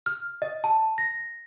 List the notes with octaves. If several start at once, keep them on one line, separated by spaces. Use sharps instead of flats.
F6
D#5
A5
A#6